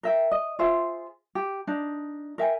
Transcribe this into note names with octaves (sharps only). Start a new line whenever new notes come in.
A#4 E5 G5
D#5
F4 G#4 C5 E5
G4
D4 D#4
A#4 E5 G5 G#5